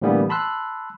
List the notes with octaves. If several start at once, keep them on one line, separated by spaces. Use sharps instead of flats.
A2 D3 E3 G3 A#3 B3
A5 B5 C6 E6 F#6